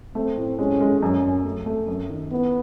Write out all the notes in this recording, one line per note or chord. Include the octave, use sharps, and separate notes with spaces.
A3 C4
A2
G#3 C#4
G#3
F#2 C#4
F#2
A3
A3
F#2
D#3
B3 E4